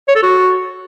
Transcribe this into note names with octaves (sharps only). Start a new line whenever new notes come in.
C#5
A4
F#4